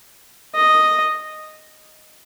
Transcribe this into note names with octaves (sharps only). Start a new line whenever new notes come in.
D#5